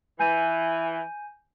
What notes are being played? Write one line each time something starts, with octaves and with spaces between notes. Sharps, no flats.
E3 G#5 G6 D#7